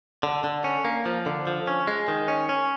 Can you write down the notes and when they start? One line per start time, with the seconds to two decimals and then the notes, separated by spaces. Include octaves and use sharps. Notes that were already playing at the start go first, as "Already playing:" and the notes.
0.23 D3
0.44 D3
0.64 C#4
0.85 A#3
1.06 F3
1.26 D3
1.47 F3
1.67 C#4
1.87 G#3
2.08 D#3
2.28 C#4
2.49 C#4